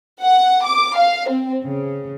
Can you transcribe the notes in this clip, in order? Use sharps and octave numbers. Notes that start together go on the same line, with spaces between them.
F#5
D6
F5
C4
C#3